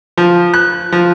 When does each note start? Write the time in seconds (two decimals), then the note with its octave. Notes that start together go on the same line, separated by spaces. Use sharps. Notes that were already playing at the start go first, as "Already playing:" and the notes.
0.17 F3
0.54 F#6
0.92 F3